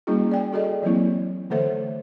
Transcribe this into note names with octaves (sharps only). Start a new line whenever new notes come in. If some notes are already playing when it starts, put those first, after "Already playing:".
G3 A#3 C#4 E4 F#4 G#4
D5 G5 G#5
F#4 G#4 A4 D5 D#5
E3 F#3 A#3 C4 E4
D3 E3 A3 A4 C5 E5